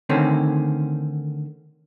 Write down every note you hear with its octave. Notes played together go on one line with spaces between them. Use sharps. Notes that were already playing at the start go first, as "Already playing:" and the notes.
D3 D#3 A3 C4 C#4